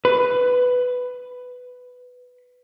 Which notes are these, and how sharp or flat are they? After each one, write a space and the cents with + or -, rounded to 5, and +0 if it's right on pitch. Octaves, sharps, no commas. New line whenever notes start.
B4 +10